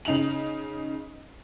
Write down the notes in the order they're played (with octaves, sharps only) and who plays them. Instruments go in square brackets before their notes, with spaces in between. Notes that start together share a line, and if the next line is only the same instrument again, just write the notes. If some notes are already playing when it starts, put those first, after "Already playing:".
[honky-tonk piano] C#3 D#4 F7 F#7